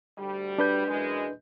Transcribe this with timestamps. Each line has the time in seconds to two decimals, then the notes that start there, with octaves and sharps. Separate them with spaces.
0.19 D2 G3
0.58 D4 B4 G6
0.88 F#2 E3 G#3